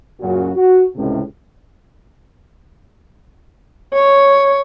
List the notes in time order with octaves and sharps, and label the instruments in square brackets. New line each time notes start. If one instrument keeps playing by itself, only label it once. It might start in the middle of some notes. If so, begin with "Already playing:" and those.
[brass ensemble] F#2 A#2 C#3 F#4
F#4
C#2 A2 C3
[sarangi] C#5